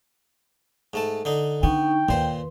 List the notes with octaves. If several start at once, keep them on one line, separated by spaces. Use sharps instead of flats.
G#2 A3 A5
D3 D#4
D3 B3 D4 D#4 G5 C#6
D#2 A#2 B4 C5 C6